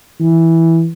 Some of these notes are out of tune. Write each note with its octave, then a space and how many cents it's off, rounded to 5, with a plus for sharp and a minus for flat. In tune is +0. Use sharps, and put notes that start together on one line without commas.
E3 -5